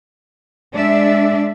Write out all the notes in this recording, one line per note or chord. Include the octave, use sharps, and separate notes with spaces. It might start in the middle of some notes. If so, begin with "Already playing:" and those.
G#3 D4 D5 E5